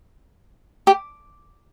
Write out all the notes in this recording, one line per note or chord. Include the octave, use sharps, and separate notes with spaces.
G4